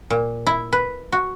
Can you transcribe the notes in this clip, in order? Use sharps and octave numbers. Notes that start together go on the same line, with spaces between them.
A#2
E4
B4
F#4